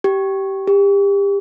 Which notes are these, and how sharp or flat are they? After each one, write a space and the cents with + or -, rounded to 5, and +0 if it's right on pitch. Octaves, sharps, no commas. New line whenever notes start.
G4 -15
G4 +30